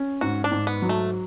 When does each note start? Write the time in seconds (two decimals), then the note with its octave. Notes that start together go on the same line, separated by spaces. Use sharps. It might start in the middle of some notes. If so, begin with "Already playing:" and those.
Already playing: C#4
0.21 G#2 F#4
0.44 D4
0.51 G#2
0.67 B3
0.82 F#3
0.89 A3